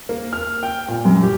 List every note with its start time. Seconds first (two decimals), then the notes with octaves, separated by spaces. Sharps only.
0.09 A#3
0.33 F6
0.63 G5
0.88 A#2
1.05 F#2
1.23 G4